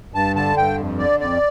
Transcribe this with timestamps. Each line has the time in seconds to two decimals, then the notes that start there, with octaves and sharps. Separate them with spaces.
0.14 G2 A5
0.35 D3 A5
0.57 G2 G5
0.78 F2
0.99 D3 D5
1.20 F2 D5